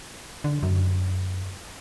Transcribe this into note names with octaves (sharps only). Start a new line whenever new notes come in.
D3
F#2